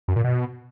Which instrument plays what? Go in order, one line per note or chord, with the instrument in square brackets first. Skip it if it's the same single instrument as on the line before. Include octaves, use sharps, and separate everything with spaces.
[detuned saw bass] F#2
A#2
B2